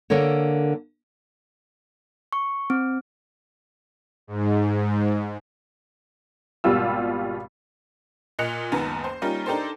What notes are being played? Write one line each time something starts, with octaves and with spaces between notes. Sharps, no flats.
D3 A#3 A4 A#4 C#5
C#6
C4
G#2
G#1 B2 G3 F4 E6
A#2 D#5 F#6 C#7 F7
F#1 C#2 D#3 B3 A5 A#5
C5
G3 A#3 C#4 D#4 F4
D4 D#4 G4 A4 A#4 C5